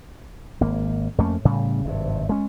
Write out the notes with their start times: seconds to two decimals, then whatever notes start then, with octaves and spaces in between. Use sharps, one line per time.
0.61 G#1 A#3
1.18 F2 A3 A#3 C#4
1.45 A2 C#3 G3
1.85 G#1 G2 C3
2.29 G#3 C#4